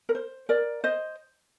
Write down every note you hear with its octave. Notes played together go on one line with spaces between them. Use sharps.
A#4
C5
A#4 D5
C5 D#5